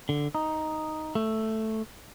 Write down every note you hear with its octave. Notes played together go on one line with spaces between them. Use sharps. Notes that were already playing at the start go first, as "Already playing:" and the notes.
D3
D#4
A3